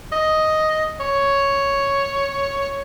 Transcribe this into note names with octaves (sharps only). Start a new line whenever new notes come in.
D#5
C#5